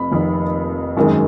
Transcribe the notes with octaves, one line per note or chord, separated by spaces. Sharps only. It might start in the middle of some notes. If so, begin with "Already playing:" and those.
Already playing: F1 F2 B5
F1 F2 D#3 A#3
G#1 F#2 D#3 G#3